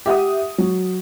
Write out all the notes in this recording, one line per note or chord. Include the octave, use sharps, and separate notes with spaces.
G4 E5 F#5 D#6
F#3